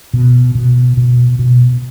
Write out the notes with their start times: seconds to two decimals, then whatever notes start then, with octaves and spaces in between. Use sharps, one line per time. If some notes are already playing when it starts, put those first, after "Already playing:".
0.14 B2
0.55 B2
0.97 B2
1.39 B2